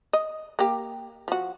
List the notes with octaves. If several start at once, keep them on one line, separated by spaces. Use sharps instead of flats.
D#5
A#3 G4
F3 F#4